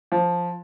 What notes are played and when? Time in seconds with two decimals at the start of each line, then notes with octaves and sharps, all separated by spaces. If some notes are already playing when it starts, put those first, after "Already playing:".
0.12 F3